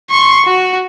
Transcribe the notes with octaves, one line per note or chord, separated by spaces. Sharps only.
C6 C#6
F#4